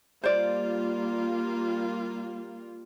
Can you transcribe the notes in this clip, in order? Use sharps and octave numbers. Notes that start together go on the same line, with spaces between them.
G3 A#3 F4 C5 D5